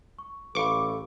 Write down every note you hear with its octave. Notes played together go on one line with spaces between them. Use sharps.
C#6
A1 A4 B4 F5 B5 C#6 D6